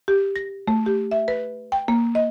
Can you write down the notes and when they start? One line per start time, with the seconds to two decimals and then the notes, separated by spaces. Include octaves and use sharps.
0.08 G4
0.36 A#6
0.68 A3
0.86 G4
1.11 E5
1.28 B4
1.72 G5
1.88 A#3
2.15 D#5